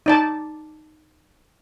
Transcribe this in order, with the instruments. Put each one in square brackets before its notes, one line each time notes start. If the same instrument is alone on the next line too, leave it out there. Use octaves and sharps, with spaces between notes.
[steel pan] D#4 D5 A5